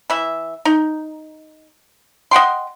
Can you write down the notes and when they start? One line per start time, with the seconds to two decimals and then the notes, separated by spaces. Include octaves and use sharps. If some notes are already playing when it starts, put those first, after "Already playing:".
0.10 E3 E5
0.65 D#4
2.31 D#5 F#5 G5 C6